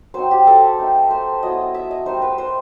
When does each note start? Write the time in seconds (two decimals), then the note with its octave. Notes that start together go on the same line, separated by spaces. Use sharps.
0.14 F#3 C4 D#4 C5
0.31 G4
0.47 A4
0.78 A3 C4 D#4
1.11 C5
1.43 F#3 B3 E4 D#5
1.74 E5
1.91 D#5
2.06 G3 D#4 C5
2.22 B4
2.38 C5